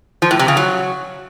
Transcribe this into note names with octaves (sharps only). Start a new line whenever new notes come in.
F3
A2
C3
C#3
F#3